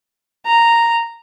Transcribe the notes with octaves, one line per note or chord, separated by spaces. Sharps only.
A#5